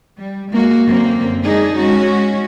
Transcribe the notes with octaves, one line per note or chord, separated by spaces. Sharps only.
G3
G#3 A#3 F#4
F#2 D3 A#3 C4
G#3 D4 D#4 G#4
G#3 C#4 F#4